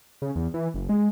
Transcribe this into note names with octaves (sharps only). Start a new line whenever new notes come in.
C#3
E2
E3
F#1
G#3